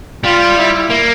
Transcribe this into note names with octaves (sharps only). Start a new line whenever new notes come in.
G3 F4
E4
A#3